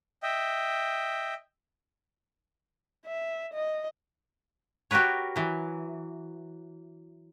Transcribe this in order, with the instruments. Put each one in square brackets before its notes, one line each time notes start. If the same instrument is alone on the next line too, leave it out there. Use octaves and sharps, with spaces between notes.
[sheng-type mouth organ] D#5 E5 G5
[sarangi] E5
D#5
[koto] F#4 G4 A#4 B4 C#5
E3 F#3